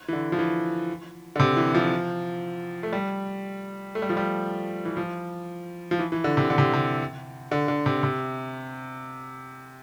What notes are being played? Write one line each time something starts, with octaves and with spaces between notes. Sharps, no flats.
E3
D3
F3
E3
D3
C3
E3
F3
A3
G3
A3
G3
F3
G3
E3
F3
F3
E3
E3
D3
C3
D3
C3
C3
D3
D3
C3
C3